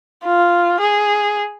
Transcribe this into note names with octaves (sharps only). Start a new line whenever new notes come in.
F4
G#4